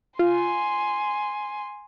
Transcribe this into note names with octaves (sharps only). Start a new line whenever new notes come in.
F4 G#5 C6